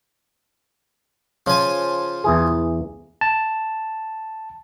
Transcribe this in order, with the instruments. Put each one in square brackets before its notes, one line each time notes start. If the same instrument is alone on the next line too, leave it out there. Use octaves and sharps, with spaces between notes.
[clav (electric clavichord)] C#3 [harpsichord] F3 G#5
[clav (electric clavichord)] E2 E3 G#4
[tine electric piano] A5